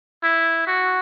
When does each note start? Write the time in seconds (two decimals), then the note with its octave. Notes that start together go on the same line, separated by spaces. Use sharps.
0.23 E4
0.67 F#4